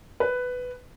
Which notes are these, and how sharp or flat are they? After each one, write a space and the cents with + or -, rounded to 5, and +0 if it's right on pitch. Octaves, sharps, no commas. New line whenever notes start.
B4 +10